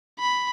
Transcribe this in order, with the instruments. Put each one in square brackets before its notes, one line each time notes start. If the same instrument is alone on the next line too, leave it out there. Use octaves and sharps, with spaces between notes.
[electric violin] B5